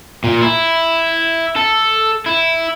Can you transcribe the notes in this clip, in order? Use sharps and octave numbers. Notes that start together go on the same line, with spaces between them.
A#2
E4
A4
E4